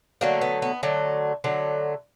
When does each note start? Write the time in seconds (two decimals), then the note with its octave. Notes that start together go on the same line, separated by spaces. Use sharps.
0.21 D3 F#3 A3 A#3
0.41 B3
0.62 B3
0.83 D3 F#3 A3
1.44 D3 F#3 A3